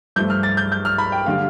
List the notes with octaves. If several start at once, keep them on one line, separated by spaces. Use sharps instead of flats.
G2 F3 A3 G6
F6
A6
G6
G6
F6
B5
G5
D3 G3 F5